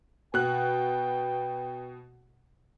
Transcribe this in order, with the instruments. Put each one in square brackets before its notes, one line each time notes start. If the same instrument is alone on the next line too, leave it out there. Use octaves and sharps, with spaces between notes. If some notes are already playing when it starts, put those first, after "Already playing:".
[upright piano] B2 F#6 [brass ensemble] B4 G5